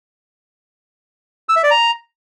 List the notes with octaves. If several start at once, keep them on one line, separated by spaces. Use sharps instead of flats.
E6
E5
D5
A#5